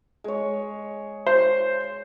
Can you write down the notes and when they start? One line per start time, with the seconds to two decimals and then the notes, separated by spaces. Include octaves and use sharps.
0.24 G#3 C#5
1.27 C5